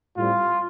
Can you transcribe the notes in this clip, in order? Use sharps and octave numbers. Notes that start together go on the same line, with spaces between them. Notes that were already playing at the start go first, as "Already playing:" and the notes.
A2 G3 C4 F4